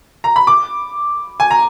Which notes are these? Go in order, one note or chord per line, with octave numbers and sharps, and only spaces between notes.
A#5
B5
D6
G#5
A#5